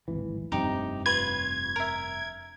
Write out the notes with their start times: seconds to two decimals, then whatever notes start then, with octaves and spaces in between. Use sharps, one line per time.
0.08 D1 G#1 E3
0.52 F1 G2 C3 D#4 G4
1.06 F4 B4 C#5 G#6
1.76 A#4 E5